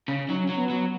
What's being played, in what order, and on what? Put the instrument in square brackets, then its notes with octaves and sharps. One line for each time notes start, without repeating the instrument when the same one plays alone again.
[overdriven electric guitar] C#3
[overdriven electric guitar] F#3 [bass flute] D#4
[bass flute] C#4
[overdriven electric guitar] F#3
[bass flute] B3
[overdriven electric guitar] F#3